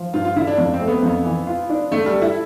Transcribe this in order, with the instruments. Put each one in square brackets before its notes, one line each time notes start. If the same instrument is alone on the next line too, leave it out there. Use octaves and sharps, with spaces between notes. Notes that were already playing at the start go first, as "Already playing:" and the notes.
Already playing: [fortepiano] F3
[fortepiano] G2 [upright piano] F4
[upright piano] F4
[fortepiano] D3 [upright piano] E4
[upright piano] D4
[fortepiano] F2
[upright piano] C4
[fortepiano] A3
[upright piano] B3
[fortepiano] F2
E3
F4
D4
[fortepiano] D3 [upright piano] A3
[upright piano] G3
[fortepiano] A3
[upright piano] E4